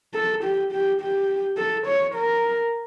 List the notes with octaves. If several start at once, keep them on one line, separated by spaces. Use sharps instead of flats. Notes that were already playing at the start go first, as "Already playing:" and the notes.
A4
G4
G4
G4
A4
C#5
A#4